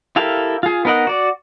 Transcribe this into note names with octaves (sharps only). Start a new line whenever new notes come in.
E4 G4 A4 A#4 F5
F4 G#4
B3 D#4 A#4 D#5 F#5
F#4 D5